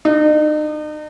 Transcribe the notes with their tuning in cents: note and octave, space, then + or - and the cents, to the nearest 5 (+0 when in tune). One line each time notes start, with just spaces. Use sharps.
D#4 -40